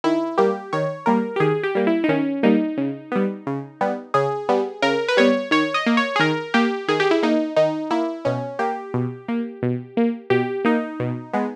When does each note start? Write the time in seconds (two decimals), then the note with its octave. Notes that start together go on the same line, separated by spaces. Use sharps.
0.04 D#3 E4
0.38 G3 A#3 G4
0.73 D#3 C#5
1.06 G3 A#3 A#4
1.36 G4
1.40 D#3 G#4
1.63 G4
1.75 G3 A#3
1.87 E4
2.04 D#4
2.09 D#3 C#4
2.43 G3 A#3 D#4
2.77 C#3
3.12 G3 B3
3.47 C#3
3.81 G3 B3
4.14 C#3 G#4
4.49 G3 B3
4.82 C#3 A#4
5.08 B4
5.17 G3 B3 C#5
5.51 D#3 C#5
5.74 D#5
5.86 A#3
5.97 C#5
6.16 G#4
6.19 D#3 A#4
6.54 A#3 G4
6.88 D#3 G#4
7.00 G4
7.11 E4
7.23 A#3 D#4
7.56 D#3 D#4
7.91 A#3 E4
8.25 B2 C#4
8.59 A#3 G4
8.94 B2
9.28 A#3
9.63 B2
9.97 A#3
10.30 B2 G4
10.65 A#3 D#4
11.00 B2
11.33 G#3 B3